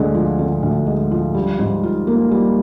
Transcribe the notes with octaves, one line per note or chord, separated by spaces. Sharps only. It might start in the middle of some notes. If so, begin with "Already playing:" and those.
Already playing: D2 D3 G#3
F3
D3
D2
G#3
F3
G3
G#2
F4
A#3
G3